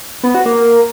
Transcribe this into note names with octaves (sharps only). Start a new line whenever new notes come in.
B3
F#4
A#3